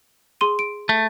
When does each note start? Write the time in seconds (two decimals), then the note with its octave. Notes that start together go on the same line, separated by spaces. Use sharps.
0.41 G#4 C6 D#7
0.59 D7
0.89 A3